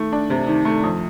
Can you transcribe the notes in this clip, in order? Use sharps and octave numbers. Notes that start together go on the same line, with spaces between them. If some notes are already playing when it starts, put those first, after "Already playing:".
Already playing: D#3 A3
D4
C3
D#3
A3
F2